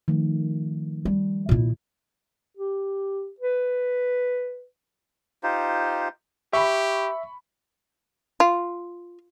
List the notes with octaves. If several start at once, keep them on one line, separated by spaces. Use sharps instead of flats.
D#3 F3 A3
G3
A#2 E4
G4
B4
D#4 F4 G4 C5
G4 E5 B5 C#6
F4